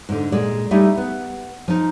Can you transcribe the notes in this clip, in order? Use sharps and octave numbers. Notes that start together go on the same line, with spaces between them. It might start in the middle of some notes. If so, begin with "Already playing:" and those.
G#2 D3
A#2 G#3 D5
G3 A3 C#4 D#4 E4
B3
F3 D#4